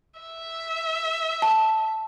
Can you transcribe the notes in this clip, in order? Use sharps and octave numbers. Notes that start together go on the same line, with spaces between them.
E5
A5